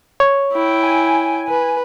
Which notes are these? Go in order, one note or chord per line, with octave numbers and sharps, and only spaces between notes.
C#5
E4 G5
G#5
B4